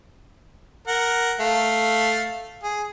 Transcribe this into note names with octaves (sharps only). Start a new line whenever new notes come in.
A#4 F#5
A3 F5
G#4